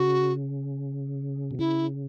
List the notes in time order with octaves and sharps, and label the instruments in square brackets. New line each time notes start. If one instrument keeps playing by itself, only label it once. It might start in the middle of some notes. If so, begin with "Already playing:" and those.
Already playing: [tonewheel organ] C#3 [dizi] F#4
[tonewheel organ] B2
[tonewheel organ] C#3 [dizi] E4